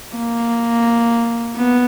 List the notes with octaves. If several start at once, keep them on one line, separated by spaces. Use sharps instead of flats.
A#3
B3